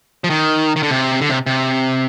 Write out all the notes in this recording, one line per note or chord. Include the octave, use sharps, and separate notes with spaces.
F3
D#3
D#3
D3
C3
D3
C3
C3